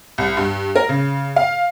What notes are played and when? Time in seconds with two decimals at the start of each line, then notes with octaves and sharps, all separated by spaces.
0.18 C2
0.37 G2
0.76 A#4
0.89 C#3
1.36 F5